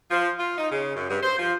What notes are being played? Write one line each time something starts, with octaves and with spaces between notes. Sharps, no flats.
F3
F4
D#4
C#3
F#2
G2
C5
F3